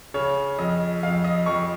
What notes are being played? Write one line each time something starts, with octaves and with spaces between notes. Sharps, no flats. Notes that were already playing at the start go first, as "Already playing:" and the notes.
C#3 C#5
F2 D#5
F2 F5
D#5
F2 C#6